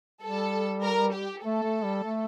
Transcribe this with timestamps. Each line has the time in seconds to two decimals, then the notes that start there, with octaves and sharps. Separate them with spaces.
0.22 G3 A4
0.83 A#4
1.13 G4
1.44 A3 A4
1.63 A3
1.84 G3
2.04 A3